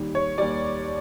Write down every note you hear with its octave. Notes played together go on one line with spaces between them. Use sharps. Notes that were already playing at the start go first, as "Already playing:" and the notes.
Already playing: D#2 D#3 G3
C#5
D#2 D#3 G3 D5